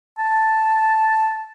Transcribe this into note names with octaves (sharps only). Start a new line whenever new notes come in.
A5